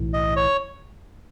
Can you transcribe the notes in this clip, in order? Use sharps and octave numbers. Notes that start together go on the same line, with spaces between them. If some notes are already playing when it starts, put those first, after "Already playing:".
Already playing: B1 A2 E3
D#5
C#5